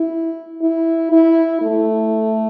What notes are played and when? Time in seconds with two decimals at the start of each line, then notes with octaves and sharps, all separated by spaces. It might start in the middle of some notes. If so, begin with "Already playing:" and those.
Already playing: E4
0.62 E4
1.12 E4
1.62 A3